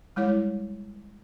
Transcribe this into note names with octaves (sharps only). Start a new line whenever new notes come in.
G3 G#3 E4 C#5